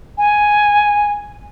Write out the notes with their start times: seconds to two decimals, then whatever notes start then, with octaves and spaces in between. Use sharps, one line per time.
0.18 G#5